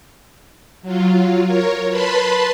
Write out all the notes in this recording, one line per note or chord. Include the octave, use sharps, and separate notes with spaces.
F#3 F4
A#4 C#5
B4 A5 B5 C6